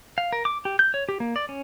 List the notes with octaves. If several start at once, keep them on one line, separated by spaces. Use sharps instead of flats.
F5
A#4
D6
G4
G6
C#5
G4
A#3
D5
C#4